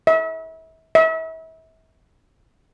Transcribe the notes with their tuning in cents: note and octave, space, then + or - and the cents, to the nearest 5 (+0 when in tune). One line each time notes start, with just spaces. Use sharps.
E5 -35
E5 -35